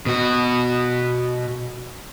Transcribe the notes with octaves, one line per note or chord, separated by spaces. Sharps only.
B2 F#4